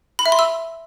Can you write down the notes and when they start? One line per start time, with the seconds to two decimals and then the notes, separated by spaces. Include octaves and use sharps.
0.19 B5
0.26 E5
0.32 C6
0.39 E6